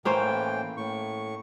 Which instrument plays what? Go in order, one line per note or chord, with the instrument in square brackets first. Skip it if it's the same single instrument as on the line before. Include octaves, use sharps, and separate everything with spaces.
[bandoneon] A2 E3 G5 [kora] A#3 C#4 C5
[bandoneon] A2 C#6